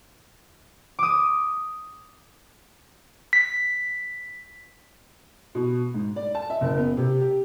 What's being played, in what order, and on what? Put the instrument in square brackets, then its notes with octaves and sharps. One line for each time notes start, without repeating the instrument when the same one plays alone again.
[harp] D6 D#6
[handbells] B6
[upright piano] B2
G#2
D5
A5
E5
F#1
B3
C3
G4